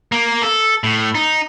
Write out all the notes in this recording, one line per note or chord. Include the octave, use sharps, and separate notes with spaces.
A#3
A4
A2
D#4